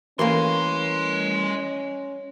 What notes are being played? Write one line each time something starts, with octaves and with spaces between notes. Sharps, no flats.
E3 A3 A#3 C#4 D#5 C6